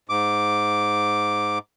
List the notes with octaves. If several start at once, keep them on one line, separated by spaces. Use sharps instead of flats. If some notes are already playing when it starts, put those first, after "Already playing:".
G#2 D6